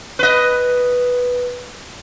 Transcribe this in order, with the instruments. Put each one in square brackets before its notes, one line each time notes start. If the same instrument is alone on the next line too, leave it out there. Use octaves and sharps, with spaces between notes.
[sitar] B4 D#5